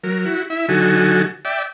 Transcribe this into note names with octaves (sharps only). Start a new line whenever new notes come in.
F#3 A#4
E4 F#4
E4 E5
D3 F#3 D#4 F#4 A4 G#5
D5 E5 G5